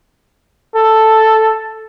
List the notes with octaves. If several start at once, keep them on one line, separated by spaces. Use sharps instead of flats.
A4